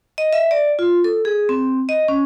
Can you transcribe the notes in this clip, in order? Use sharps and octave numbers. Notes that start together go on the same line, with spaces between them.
D#5
E5
D5
F4
A4
G#4
C4
D#5
C#4